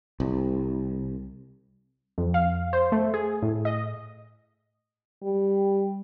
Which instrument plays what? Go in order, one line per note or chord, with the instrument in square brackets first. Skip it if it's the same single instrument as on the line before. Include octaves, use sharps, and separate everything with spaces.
[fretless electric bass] C2
[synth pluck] F2
F5
C5
A3
G#4
A2
D#5
[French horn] G3